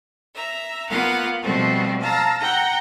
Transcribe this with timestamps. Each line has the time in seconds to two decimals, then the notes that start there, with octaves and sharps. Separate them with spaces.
0.35 E5 A#5
0.88 A#3 B3 F4 F5 F#5
1.42 B2 F3 G3 A3 C4
2.01 F5 A5 A#5 E6
2.39 F#5 G5 A#5